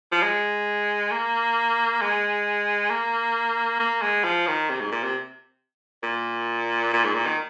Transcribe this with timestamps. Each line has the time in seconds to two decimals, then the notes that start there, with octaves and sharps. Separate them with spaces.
0.12 F3
0.23 G#3
1.12 A#3
2.01 G#3
2.90 A#3
3.80 A#3
4.02 G#3
4.24 F3
4.47 D#3
4.70 C3
4.81 G#2
4.91 A#2
5.03 C3
6.03 A#2
6.93 A#2
7.04 G#2
7.14 A#2
7.26 D#3